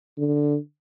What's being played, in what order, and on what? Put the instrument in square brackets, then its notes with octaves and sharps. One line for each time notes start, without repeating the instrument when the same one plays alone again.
[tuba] D3